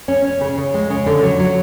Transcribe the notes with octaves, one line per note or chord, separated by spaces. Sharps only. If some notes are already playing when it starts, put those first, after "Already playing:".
C#4
C#4
C#3
C#3
G#3
C#3
D3
F#3
F#3